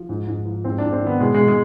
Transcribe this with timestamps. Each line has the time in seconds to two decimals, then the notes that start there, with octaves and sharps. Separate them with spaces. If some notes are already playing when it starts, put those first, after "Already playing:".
Already playing: F3
0.09 G#2
0.27 G#2
0.45 F3
0.64 G#2 C4
0.78 D4
0.84 G#2
0.93 C4
1.02 D#3 B3
1.20 B2 G#3
1.34 B2 G#3
1.48 G#3